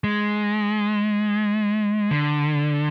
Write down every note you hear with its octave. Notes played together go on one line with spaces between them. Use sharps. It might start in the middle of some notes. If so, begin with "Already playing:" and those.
G#3
D3